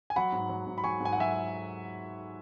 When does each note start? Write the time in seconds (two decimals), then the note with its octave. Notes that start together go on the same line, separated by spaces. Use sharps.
0.10 G#5
0.16 F#3 F#5 B5
0.32 G#2
0.49 F#3
0.67 G#2
0.78 B5
0.84 F#3 G#5 C#6
1.00 G#2
1.05 G#5
1.13 F#5
1.17 F#3 E5 G#5